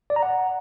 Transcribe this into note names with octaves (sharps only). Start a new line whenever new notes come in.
D5
A#5
F#5